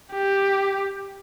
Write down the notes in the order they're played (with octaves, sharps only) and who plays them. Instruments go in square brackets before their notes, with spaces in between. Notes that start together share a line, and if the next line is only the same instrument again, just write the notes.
[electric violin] G4